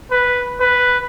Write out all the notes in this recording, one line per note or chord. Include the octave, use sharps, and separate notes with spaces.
B4
B4